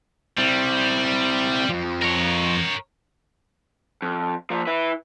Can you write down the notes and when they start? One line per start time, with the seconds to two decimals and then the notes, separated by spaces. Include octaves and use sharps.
0.38 G3 C4 E4
1.69 F2 F3
2.02 A#4 C#5
4.02 F2
4.50 F3 A#3
4.67 E4 B4